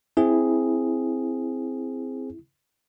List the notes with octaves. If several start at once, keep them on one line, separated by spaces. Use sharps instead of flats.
C4 E4 G#4